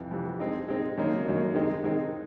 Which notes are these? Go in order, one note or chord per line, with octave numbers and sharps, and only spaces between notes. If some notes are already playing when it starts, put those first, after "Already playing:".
Already playing: F2 C3 E3
F2 C3 E3
G#3 C4 D#4
G#3 C4 D#4
F#2 D#3 F#3 A#3 D#4
F#2 D#3 F#3 A#3 D#4
D#3 G#3 C4 D#4
D#3 G#3 C4 D#4